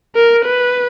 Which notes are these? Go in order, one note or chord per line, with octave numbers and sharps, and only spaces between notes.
A#4
B4